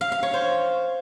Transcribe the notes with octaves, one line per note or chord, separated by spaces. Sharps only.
F5
F5
C#5
C5